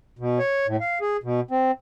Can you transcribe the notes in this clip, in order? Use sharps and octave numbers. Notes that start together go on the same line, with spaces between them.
B2
C#5
A2
F5
G#4
B2
C4